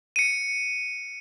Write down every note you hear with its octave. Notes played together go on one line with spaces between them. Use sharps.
C#7 D#7